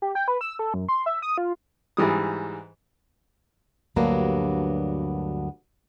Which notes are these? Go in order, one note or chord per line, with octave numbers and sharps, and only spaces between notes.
G4
G5
B4
E6
A4
F#2
C6
E5
D#6
F4
G#2 E3 G3 D#6
D2 G2 F#3 A#3 B3 D4